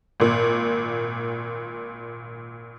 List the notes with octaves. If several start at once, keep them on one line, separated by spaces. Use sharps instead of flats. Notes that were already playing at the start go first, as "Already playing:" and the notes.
G#1 A#2